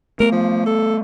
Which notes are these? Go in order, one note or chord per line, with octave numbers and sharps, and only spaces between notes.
A3 B3 A#4
F3
A4